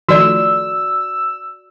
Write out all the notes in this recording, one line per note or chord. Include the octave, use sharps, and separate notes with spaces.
D#3 F3 A3 F#4 D5 E6